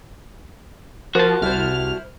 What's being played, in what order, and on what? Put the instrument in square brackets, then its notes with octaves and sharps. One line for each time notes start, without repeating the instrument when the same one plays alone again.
[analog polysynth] F3 [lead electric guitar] F#4 A5 [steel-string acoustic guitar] A#4 C5
[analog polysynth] C2 F6 [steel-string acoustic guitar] E4 C5